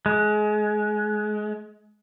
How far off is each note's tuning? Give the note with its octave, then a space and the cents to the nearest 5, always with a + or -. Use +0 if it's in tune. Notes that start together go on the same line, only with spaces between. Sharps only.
G#3 +25